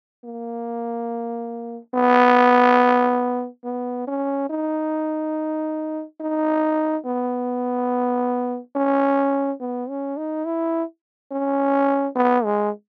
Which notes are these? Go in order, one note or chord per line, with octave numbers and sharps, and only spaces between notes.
A#3
B3
B3
C#4
D#4
D#4
B3
C#4
B3
C#4
D#4
E4
C#4
B3
G#3